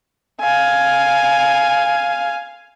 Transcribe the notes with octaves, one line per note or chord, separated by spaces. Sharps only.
F5 G#5